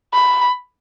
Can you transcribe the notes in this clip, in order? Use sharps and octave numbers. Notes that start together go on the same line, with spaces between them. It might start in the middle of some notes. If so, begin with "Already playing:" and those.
B5